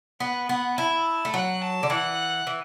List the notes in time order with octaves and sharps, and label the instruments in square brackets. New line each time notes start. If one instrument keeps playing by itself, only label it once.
[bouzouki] B3 [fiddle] F#5
[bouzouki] B3 [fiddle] F#5
[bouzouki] E4 [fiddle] A5
[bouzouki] A3
[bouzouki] F#3 [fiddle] F#5
[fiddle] A5
[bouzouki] D3
[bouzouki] E3 [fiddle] F#5
[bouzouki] E3